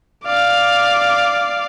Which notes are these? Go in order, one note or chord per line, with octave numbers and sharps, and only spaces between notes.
D5 F5